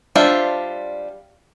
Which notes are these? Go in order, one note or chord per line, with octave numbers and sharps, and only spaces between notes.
G3 D4 F4 C5 E5